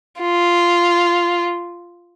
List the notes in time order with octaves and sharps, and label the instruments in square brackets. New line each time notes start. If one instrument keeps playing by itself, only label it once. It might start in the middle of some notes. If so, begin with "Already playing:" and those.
[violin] F4